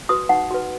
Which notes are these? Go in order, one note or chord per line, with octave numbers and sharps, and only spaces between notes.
F#4 B4 D#6
D#4 F#5
F#4 B4